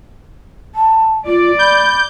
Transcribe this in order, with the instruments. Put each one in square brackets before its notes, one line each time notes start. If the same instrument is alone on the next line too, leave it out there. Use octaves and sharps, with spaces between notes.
[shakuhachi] A5
[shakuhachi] F4 [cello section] D5
[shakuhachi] B5 [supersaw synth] G6